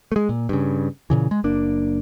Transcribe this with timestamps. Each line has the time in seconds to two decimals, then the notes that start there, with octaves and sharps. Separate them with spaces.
0.12 G#3 A3
0.29 A#2
0.49 G2 C#3
1.10 A#2 C#3 E3
1.31 G#3
1.44 F#1 A#3 D4